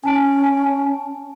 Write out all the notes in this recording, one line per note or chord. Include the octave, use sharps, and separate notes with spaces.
C#4 G#5 A5 D7